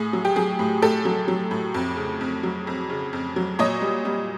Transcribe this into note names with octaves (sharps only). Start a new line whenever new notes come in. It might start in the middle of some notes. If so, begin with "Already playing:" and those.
Already playing: A2 G#4
F#3
G4
F#3 G#4
A2
A2 G4 A4
F#3
F#3
A2
F2
C#3
F2
F#3
F2
C#3
F2
F#3
A#2 C#5 D#5
G3
G3